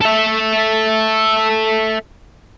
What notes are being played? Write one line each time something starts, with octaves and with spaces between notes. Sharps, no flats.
A4 E5